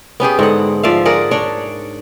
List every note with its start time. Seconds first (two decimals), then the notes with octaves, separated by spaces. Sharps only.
0.20 B3 C#4 G4 G#4
0.39 G#2 D3 F#5
0.83 F3 D5 E5 F5
1.05 G#4 A#4 D5 F#5
1.31 D4 C#5 D5